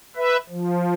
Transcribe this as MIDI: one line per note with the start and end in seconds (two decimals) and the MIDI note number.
0.16 0.37 71
0.16 0.37 76
0.49 0.94 53